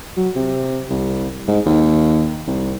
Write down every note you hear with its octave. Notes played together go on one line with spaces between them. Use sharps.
F#3
C3
C2
G#2
D#2
C2